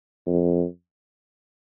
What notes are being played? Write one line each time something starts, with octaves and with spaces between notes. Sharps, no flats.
F2